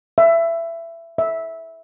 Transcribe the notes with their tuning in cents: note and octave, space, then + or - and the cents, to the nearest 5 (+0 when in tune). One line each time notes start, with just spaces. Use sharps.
E5 +20
E5 -10